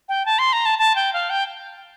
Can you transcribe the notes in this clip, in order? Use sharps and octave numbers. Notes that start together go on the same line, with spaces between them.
G5
A5
C6
A#5
A5
A5
G5
F5
G5